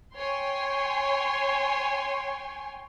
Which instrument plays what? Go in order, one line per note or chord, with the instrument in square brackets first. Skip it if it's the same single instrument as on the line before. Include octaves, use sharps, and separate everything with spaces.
[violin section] C#5 G5 G#5 C6